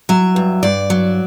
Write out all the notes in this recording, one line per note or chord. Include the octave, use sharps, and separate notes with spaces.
F#3 E5
G2
G2 D5
F#3